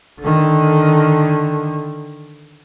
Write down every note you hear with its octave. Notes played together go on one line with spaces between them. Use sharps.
D3 D#3